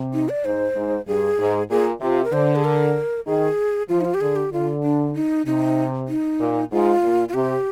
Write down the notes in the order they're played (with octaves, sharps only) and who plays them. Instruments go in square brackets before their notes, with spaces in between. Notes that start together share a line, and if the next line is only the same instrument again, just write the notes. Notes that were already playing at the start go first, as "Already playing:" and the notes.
Already playing: [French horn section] C3
[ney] D#4
D5
[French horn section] G#2 [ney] C5
[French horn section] G#2
[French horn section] G2 [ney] G#4
[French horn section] G#2
[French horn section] A#2 [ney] G#4
[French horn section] C3 [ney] F4
[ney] A#4
[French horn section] D3 [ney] C5
[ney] G#4
A#4
[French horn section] D#3 [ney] G#4
[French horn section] F3 [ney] F4
[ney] D#4
F4
G4
[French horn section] D3 [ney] G#4
[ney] G4
[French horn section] D3 [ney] F4
[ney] D4
D#4
[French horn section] C3 [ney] D#4
[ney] D#4
[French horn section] A#2
[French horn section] G#2 [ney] F4
[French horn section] A#2
[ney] F4
[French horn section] C3 [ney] G4